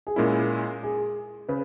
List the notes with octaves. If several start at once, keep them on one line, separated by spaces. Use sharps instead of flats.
G#4
A#2 G#3 C#4 E4 A#4
G#4
C#3 B4